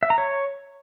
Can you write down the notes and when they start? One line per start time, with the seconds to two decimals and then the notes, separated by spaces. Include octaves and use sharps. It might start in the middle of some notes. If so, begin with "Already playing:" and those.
0.03 E5
0.10 A#5
0.18 C#5